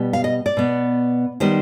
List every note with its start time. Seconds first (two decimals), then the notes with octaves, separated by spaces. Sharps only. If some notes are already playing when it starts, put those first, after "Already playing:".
Already playing: B2 G3 B3
0.13 F5
0.24 D#5
0.46 D5
0.57 B2 B3
1.40 D#3 G3 B3 C5